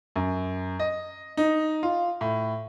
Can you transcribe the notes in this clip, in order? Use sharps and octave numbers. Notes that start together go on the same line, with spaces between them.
F#2
D#5
D#4
F4
A2